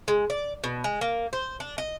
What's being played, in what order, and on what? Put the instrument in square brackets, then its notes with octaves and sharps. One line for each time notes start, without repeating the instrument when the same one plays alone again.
[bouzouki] G#3
D5
B2
G#3
A#3
C5
D4
D#5